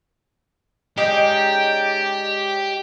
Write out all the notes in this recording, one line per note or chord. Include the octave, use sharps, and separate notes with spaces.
G#3 C#4 D#4 G4 D5 G5